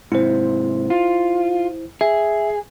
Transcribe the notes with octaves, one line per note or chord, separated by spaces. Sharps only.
G#2 C3 E4 C5
F4
G#4 E5